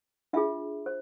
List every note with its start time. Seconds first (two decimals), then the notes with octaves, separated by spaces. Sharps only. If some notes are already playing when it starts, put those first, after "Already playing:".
0.33 D4 F4 G#4 E5
0.86 C5